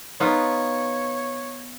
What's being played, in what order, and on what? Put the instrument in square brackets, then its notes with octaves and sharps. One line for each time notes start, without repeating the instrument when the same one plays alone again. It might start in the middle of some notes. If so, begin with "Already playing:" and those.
[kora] B3 D#4 F4 [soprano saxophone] C#5